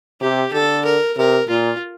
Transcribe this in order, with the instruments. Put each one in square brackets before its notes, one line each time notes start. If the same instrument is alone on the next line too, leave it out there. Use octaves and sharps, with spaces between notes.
[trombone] C3 [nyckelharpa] G4
[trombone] D3 [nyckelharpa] A4
[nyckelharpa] A#4
[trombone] C3 [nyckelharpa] A#4
[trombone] A#2 [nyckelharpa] F4